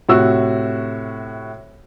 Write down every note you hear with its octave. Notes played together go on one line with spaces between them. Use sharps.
A2 C3 F#4 E6